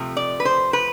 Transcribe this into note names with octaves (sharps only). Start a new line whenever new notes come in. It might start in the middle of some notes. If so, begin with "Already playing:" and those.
Already playing: C3 F3 A3
D5
B4
C5
B4